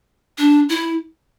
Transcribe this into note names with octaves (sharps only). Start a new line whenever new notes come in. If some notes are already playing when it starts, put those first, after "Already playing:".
D4
E4